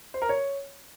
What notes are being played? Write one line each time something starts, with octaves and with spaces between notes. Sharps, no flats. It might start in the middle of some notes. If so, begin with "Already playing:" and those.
C5
A#4
C#5